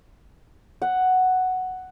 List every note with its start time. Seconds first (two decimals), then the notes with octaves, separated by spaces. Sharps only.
0.82 F#5